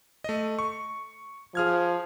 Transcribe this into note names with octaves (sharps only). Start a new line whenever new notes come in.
A3 D#5
C#6
F3 G#4 F6 G#6